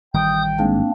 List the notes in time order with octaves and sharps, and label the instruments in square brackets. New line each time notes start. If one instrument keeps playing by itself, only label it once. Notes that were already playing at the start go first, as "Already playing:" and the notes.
[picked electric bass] A1 D#3 G3 [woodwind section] G5 [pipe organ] D#6 G6
[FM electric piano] G#2 [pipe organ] A#3 C4 D4